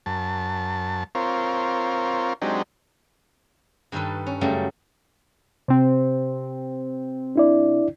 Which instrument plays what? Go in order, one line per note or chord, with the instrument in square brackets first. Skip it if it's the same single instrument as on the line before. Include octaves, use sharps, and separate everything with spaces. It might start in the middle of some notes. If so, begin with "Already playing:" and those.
[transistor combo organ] F#2 A5
C4 F4 A#4 C#5
F#3 G#3 C4 D4 D#4 G4
[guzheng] G2 D#3 G3 D#4 A4 B4
C#4
F#2 C#3 G3 A3 G5
[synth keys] C3 C4
[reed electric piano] D4 E4 D5